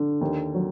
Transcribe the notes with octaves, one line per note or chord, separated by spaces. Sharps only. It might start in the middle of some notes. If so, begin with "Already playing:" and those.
Already playing: D3
D#2
F#3